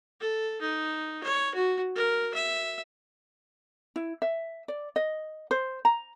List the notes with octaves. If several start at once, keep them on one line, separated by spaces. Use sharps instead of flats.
A4
D#4
C#5
F#4
A#4
E5
E4
E5
D5
D#5
C5
A#5